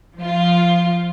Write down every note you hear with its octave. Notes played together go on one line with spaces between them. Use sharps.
F3 F4